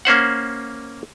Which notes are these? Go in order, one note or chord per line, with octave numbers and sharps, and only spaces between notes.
A#3 C#4 C5 F#5